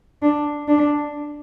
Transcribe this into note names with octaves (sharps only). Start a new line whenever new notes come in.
D4
D4